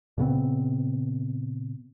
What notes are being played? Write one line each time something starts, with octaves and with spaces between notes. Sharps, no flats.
A#2 C#3 B3 C4